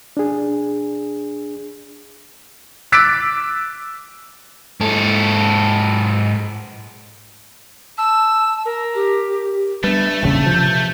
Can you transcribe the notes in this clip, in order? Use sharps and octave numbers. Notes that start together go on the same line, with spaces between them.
D4 G#4
D6 E6 F#6 A6 B6 D7
G#2 A4
A5 E6
A#4
G4
G3 A3 B3 D4 B4
D#1 G#1 E2 A#2 C#3
C3 F3 G6